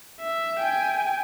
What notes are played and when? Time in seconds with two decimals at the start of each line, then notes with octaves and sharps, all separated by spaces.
0.20 E5
0.59 G5 G#5